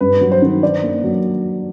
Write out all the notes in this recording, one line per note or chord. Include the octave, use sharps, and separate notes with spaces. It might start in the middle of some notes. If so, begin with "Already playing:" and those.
G2 B4
F#3
C5
D#3
D4 D5
A#3
F#3